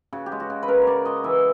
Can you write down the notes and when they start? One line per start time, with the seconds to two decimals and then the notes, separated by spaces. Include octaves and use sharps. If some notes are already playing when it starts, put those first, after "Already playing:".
0.13 C#3 F#4
0.26 G4
0.32 G#3
0.40 F#4
0.50 C#3
0.63 B4
0.68 C#3 A#4
0.82 C#5
0.87 C#3 D5
1.05 G#3 D#5
1.24 E3 E5